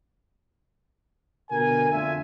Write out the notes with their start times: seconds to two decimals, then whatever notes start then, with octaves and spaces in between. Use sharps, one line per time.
1.51 B2 D3 A#4 G#5
1.91 F2 D3 A3 F4 E5 G#5